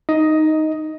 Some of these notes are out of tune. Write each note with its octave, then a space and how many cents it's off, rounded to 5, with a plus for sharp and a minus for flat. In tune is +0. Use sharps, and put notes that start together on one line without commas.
D#4 +0 D#5 +10